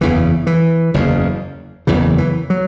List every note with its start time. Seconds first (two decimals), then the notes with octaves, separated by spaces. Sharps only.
0.01 F#1 E2 C#3 E3
0.47 E3
0.94 F#1 E2 C#3
1.87 F#1 E2 C#3 E3
2.18 E3
2.50 F#3